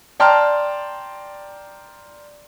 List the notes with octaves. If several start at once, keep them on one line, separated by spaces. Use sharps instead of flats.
D5 G5 A5 A#5 C6 F6